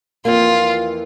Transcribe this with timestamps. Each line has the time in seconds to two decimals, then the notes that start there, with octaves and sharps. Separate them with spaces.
0.25 F2 E3 A#3 F4